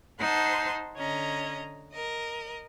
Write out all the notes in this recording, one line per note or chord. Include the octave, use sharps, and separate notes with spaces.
D#4 C5 F#5 A5 C6
D3 C#4 D#5 A#5
A#4 D#5